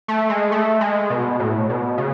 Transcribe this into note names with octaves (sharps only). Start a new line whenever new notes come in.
A3
G#3
A3
G#3
B2
A2
B2
C#3